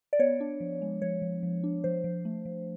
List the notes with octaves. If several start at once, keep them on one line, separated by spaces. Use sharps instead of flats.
D5
B3 C#5
D4
F3
G#3
F3 C#5
F3
F3
D4
F3 C5
F3
A3
F3